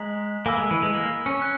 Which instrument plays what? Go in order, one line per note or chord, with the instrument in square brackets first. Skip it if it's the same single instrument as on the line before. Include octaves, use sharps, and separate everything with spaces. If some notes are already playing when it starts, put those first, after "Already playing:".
Already playing: [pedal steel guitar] G#3 [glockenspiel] A#5 D#6 F#6 B6 F#7
[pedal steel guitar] A#3 [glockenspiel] G#5 B5 E6
[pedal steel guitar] G#3
E3
G#3
A#3
C#4
[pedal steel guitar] C#4 [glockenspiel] F#6